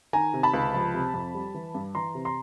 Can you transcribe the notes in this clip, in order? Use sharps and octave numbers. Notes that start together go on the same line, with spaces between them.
D#3 G#5 A#5
C3
A5 B5
C#2
F3
C3
F2
G3
E3
G2
E3 A#5 C6
C3
A#5 C6